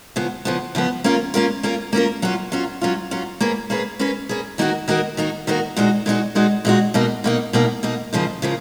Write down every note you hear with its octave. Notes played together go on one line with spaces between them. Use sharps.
C#3 F3 B3
C#3 F3 B3
C#3 F3 B3
A#3 C#4 F4 A#4
A#3 C#4 F4 A#4
A#3 C#4 F4 A#4
A#3 C#4 F4 A#4
F#3 C#4 F4
F#3 C#4 F4
F#3 C#4 F4
F#3 C#4 F4
A#3 C#4 G#4 B4
A#3 C#4 G#4 B4
A#3 C#4 G#4 B4
A#3 C#4 G#4 B4
D#3 A#3 D#4 F#4 A#4
D#3 A#3 D#4 F#4 A#4
D#3 A#3 D#4 F#4 A#4
D#3 A#3 D#4 F#4 A#4
A#2 G#3 D#4 F#4
A#2 G#3 D#4 F#4
A#2 G#3 D#4 F#4
A#2 G#3 D#4 F#4
B2 A#3 D#4
B2 A#3 D#4
B2 A#3 D#4
B2 A#3 D#4
C#3 F3 A#3 D#4
C#3 F3 A#3